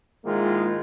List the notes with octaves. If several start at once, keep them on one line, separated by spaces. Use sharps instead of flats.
G#2 D#3 G#3 A#3 E4 F4